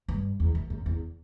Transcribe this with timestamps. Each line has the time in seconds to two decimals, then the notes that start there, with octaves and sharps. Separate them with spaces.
0.08 G2
0.40 E2
0.55 F#2
0.70 F#2
0.86 E2